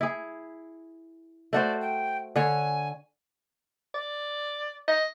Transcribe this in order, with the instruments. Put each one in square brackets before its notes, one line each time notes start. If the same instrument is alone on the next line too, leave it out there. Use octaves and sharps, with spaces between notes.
[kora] E4 G#4
[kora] A3 F#4 C5 [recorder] D5
[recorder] G5
[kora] D3 C#5 [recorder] G#5
[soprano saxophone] D5
D#5